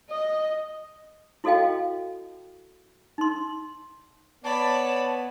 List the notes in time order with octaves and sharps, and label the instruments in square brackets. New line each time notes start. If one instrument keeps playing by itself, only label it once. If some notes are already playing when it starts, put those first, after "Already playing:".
[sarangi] D#5
[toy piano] E4 F#4 A4 D#5 F5 G5
D#4 C6
[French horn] B3 [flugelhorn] C#5 [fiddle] D5 B5 [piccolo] A5